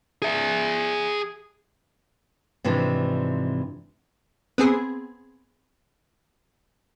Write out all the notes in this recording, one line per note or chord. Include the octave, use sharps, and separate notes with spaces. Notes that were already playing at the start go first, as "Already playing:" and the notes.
G#4 E5
G#2 C3 E3 F3 D4
B3 C4 G#4